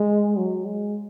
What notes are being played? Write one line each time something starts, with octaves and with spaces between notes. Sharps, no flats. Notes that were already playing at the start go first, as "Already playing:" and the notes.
Already playing: G#3
F#3
G#3